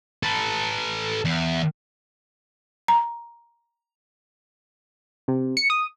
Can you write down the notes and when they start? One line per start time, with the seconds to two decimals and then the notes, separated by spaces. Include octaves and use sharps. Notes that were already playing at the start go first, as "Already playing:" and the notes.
0.23 A4 B4
1.25 E2
2.88 A#5
5.28 C3
5.57 C#7
5.70 D#6